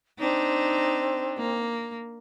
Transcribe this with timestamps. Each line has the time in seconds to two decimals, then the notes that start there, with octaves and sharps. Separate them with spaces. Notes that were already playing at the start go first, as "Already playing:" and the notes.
0.19 C4 D4 D#4
1.38 A#3